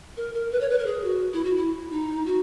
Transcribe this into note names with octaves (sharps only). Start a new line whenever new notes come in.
A#4
A#4
B4
C#5
B4
A#4
G#4
F#4
E4
F#4
E4
D#4
F#4